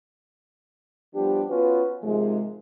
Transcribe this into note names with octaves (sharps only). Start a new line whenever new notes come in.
F3 G3 B3 D4 G4
B3 C#4 F4 F#4 B4
G#2 C3 D#3 F3 G#3